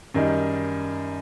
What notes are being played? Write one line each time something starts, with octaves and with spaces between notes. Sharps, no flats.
F#2 D#3 G3 D#4